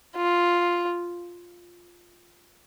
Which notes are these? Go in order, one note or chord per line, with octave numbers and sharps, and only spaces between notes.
F4